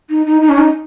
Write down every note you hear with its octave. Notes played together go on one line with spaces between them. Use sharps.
D#4
D#4
D#4
C#4
D#4